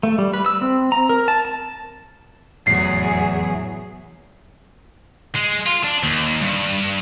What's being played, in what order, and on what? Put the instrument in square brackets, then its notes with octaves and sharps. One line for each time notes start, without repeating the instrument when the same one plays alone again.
[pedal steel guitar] A3
G3
B4
E6
C4
A#5
A#4
A5
A5
[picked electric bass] F1 A2 [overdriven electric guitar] E2 [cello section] F#3 G#4 [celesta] C7
[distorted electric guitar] G#3
F4
D4
D#2
G2